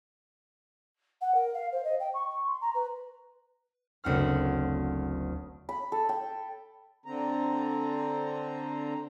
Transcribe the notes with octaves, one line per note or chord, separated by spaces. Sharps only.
F#5
A#4
F5
C5
D#5
G5
C#6
C#6
C6
A#5
B4
F#1 D2 C4 F#5 F6
B5
A4
G5
D3 C4 A#5